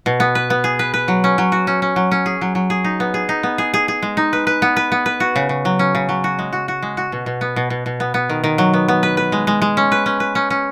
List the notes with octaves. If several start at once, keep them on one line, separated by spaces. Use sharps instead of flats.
B2
B3
B4
B3
G#4
B4
B4
F#3
C#4
F#3
F#4
C#4
C#4
F#3
C#4
G#4
F#3
F#3
G#4
D#4
B3
G#4
D#4
B3
G#4
G#4
G#4
G#3
D#4
B4
B4
B3
B4
B3
B4
F#4
C#3
C#3
F#3
C#4
C#3
F#3
F#4
G#3
F#4
F#4
G#3
F#4
B2
B2
B3
B2
B2
B2
B3
B3
D#3
D#3
F#3
B3
B3
B4
B4
G#3
G#3
G#3
C#4
B4
C#4
B4
C#4
C#4